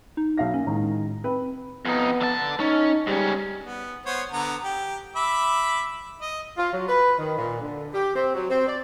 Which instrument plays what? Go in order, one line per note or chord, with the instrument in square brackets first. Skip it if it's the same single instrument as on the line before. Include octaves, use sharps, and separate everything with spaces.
[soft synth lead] D#4
[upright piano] B1 F5 A#6
[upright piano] A#3 [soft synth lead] C#4
[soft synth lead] A2 [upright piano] D#3 G#3 A#5
[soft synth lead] C4 [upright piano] B4
[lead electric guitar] F2 D#4 [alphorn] B3
[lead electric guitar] D3 A5
[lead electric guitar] C#4 [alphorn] D#4
[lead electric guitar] G#2 C#4 [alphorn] G3
[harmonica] B3
B3 C5 C#5
D3 B3 A#5
G4
E5 B5 D6
D#5
[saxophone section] F4
F#3
B4
D#3
A#2
D3
G4
C4
F#3
C4
D5